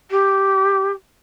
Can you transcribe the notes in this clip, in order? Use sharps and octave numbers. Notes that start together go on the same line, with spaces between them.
G4